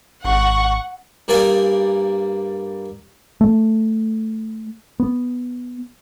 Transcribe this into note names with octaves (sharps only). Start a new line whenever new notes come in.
G#1 F#5 C#6
G2 G3 A#3 A#4 D5 G#5
A3
B3